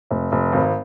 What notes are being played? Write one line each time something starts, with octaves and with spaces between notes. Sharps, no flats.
F1
F1
G#1